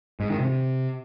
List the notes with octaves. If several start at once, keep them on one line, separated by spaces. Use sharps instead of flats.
G#2
D#3
C3